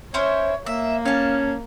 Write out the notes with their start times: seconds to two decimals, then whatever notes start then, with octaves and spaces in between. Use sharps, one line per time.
0.14 C#4 E4 C5 C#5
0.66 A#3 E5
1.06 C#4 F5 A5